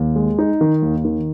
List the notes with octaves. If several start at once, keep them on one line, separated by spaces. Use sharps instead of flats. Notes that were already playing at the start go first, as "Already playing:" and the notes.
Already playing: D#2
G#3
D#4
D#3
D#2
D#3